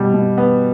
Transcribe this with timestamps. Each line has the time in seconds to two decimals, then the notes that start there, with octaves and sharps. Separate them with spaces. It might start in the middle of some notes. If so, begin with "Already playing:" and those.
Already playing: B2 G3
0.14 B2
0.38 B3